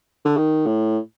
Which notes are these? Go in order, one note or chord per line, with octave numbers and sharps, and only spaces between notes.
D3
D#3
A2